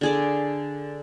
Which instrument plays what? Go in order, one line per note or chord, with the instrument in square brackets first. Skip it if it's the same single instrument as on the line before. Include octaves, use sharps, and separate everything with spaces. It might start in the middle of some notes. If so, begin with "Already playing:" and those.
[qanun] D3 G#4 D5